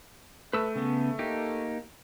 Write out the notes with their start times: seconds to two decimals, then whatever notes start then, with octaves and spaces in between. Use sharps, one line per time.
0.53 A3 B4 E6
0.75 C#3 B3
1.19 A#3 D#4 G4